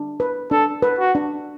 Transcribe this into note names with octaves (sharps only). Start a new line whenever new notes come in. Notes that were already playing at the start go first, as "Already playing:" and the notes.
Already playing: D4
B4
D4 A4
B4
F#4
D4